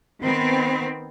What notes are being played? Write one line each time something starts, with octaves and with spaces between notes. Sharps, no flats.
D#3 B3 C4